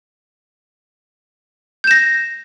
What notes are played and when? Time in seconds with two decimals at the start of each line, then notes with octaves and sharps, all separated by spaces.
1.84 G6
1.87 E7
1.91 A#6